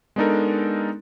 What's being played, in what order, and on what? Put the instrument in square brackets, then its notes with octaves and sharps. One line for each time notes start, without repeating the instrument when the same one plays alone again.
[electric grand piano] G#3 B3 D4 D#4 A4 A#4